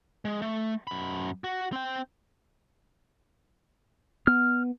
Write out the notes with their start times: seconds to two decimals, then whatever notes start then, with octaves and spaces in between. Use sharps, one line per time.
0.25 G#3
0.42 A3
0.87 F#2 B5
1.44 F#4
1.73 C4 G5
4.27 B3 F6